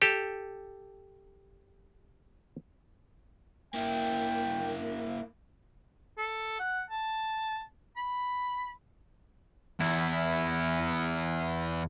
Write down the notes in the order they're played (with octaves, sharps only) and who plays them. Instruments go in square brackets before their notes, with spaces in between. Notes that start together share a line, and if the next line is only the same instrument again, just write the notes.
[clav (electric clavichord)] G4 A4
[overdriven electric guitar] A#3 E4 [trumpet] G5
[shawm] A4
F#5
A5
B5
[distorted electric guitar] E2 E4